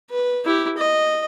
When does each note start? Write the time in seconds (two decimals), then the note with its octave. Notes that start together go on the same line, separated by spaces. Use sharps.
0.10 B4
0.46 E4 G4
0.77 D#5